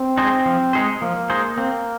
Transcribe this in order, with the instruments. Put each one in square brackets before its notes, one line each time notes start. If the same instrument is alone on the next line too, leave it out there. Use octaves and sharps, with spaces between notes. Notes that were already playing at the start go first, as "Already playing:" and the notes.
Already playing: [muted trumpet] C4
[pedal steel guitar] G#3 D#4 G#4 C5
F3
G#3 D#4 G#4 C5
[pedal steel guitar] F3 [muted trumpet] A#3
[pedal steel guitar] G#3 D#4 G#4 C5
[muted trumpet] A#3 [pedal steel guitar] C4